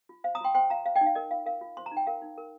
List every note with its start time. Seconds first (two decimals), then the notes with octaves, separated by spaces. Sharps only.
0.09 F4
0.24 C5 F5
0.35 A#5 D#6
0.40 F4 G5 C6
0.55 C5 G5 C6
0.70 F4 F5 A#5
0.86 C5 F5
0.96 D#5 G5
1.01 D#4
1.06 F5
1.15 A#4 D#5
1.31 F4 F5
1.46 A#4 F5
1.61 F4
1.77 C5 C6
1.86 A#5
1.92 D#4
1.97 G5
2.07 A#4 F5
2.22 D#4
2.38 A#4